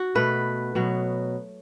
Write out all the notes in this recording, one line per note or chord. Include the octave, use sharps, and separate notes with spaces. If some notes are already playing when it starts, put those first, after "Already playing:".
Already playing: F#4
B2 A3 B4
B2 F#3 B3